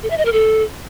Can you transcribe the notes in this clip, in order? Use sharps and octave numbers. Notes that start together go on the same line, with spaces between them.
A4
E5
D#5
A#4
A4